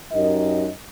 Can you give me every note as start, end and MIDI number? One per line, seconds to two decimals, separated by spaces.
0.12 0.67 42
0.12 0.67 63
0.12 0.67 67
0.12 0.67 70
0.12 0.67 75